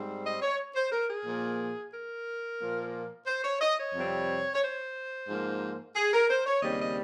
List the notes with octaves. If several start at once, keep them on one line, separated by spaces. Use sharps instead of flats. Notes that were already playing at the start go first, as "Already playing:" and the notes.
Already playing: G#2 G3 C4
D#5
C#5
C5
A#4
G#4
A#2 F3 A#3
A#4
A#2 F3 A#3
C5
C#5
D#5
C#5
F2 C3 G3 C4
C#5
C5
G#2 F3 A#3
G#4
A#4
C5
C#5
D#2 C#3 G3 C4 D#5
D#5